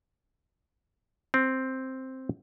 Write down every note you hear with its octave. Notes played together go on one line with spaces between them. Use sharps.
C4